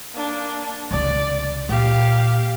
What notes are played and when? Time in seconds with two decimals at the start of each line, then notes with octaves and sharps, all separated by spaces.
0.14 A#3 D4
0.91 C#2 C3 D5
1.69 A#2 G4 F5